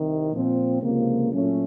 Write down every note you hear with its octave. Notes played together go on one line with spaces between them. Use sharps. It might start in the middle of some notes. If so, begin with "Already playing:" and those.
Already playing: C2 C3 D#3
A#2 F3 C4
C#2 C3 F3 A#3
A#2 F#3 A3 C#4